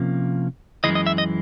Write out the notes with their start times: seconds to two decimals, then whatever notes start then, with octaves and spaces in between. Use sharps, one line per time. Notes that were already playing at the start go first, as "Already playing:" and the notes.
Already playing: C3 F3 A#3 C#4
0.84 F#2 C#3 E3 G#3 D#5
0.95 D#5
1.07 E5
1.18 D#5